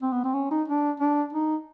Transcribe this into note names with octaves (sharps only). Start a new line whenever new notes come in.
C4
B3
C4
C#4
D#4
D4
D4
D#4